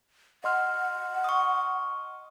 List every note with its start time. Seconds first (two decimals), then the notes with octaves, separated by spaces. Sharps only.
0.44 D#5 F#5 C6 F6
1.24 C#6 D#6